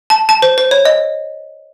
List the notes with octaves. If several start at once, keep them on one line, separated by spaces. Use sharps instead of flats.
A5
A5
C5
C5
C#5
D#5